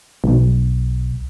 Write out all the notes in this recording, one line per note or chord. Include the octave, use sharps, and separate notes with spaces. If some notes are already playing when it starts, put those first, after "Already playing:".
B1